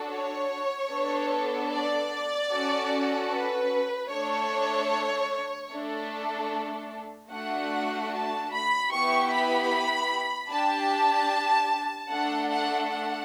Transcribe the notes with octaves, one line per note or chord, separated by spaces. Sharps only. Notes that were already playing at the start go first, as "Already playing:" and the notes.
Already playing: D4 F#4 A4
C#5
B3 D4 A4
D5
C#4 F#4 A4
B4
A3 D4 A4 C#5
A3 D4 A4
A3 D4 F#4 F#5
A5
B5
B3 E4 G4 C#6
B5
D4 G4 A5
A3 D4 A4 F#5
F#5
F#5